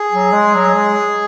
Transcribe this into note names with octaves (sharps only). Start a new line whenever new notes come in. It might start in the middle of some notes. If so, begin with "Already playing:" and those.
Already playing: G#4
F#3
G#3
F#3
G#3